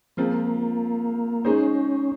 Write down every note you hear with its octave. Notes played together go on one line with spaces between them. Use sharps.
F3 G#3 A#3 C4 F4
G#3 C#4 D#4 G#4 C5